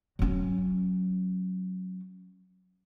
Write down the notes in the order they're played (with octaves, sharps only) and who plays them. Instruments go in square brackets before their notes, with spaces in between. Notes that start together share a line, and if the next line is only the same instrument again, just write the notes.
[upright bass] F#3 C#4